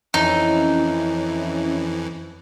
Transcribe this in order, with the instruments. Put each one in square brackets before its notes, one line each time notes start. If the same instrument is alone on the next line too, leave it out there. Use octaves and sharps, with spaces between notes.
[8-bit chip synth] F2 E3 [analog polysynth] C#4 E4 [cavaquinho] D#4